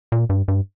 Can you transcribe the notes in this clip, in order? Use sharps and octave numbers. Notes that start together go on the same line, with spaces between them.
A#2
G2
G2